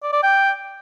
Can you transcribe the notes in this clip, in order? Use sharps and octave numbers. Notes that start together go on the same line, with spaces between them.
D5
D5
G5